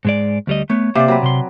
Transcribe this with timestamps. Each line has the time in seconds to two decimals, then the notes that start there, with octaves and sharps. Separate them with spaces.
0.05 G#2 G#3 D5
0.47 D2 G3 D#5
0.70 A3 B3 C#5
0.95 C3 A#3 C5 D5 F5
1.08 F#3 C4 B4
1.23 C3 C6